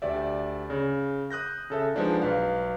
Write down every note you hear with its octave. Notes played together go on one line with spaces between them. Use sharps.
D2 G4 D5 E5
C#3
D#6 F#6 G6 A#6
C#3 A4 E5
F3 G#3 B3 D4 D#4
B1 B4 F5